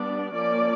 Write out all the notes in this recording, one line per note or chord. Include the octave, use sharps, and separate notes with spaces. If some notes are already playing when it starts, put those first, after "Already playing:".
Already playing: G3 B3 D4 D5
F3 A#3 C#4 D5